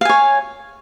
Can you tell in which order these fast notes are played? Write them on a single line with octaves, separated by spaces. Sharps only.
F5 G#5 C#5